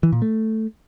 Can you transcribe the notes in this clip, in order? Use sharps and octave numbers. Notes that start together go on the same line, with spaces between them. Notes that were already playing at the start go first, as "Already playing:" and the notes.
E3
A#2
A3